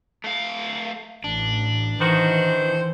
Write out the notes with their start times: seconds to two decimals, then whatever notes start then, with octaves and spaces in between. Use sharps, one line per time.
0.24 A3 F5
1.24 A1 D4
2.00 D#3 E3 D#4 F#4 C5